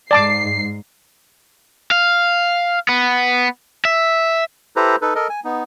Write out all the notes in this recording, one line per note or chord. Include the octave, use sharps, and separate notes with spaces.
G#2 D5 A5 D6 C7
F5
B3
E5
E4 G4 A4 B4 C5 A#5
D#4 A4 B4
A4 A#4 D#5
G#5
B3 D#4